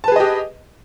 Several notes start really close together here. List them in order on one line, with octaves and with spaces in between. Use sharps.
A5 B4 G#4 D#5 G4